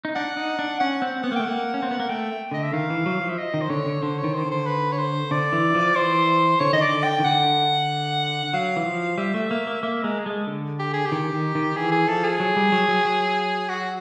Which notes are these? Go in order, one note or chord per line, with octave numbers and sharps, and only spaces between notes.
D#4
D4 F#5
D#4
D4
C#4 F#5
C4 F#5
B3 F#5
A#3
A3 G5
A#3 F#5
C#4
C4
B3
A#3
A3 G5
D3 D#5
E5
D#3 F5
E3
F#3
F3
E5
D#5
D#3
C5
D3 C#5
D3
D3 C5
C#5
D#3
C5
D3
C5
B4
C#5
C5
D3 D5
E3
F3
E3 C5
D3 C#5
D#3 D#5
D5
D3
G5
D#3
D3 F#5
F#3 F5
E3
F3
G3 E5
A3
A#3
A#3
A#3 E5
G#3 A#4
G#4
G#3 A4
D3
G4
G#4
G4
D#3
D#3
D#3
E3 G#4
G#4
F3 A4
G#4
F#3
G3
F#3
F#3
F#3
F#4